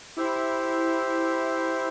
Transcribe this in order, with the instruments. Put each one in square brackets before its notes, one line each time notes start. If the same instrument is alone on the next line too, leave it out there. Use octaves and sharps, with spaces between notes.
[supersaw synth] E4 [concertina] G4 C5 E5